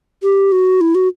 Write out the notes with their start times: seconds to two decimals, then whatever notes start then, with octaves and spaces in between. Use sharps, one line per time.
0.23 G4
0.52 F#4
0.81 E4
0.95 F#4